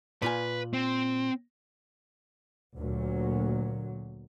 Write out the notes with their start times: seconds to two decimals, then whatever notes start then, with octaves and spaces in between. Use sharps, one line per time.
0.22 A#2 F4 B4 G#5
0.73 C4
2.77 D2 A#2 F#3